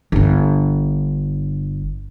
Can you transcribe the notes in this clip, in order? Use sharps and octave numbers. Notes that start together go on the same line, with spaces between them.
G1 D4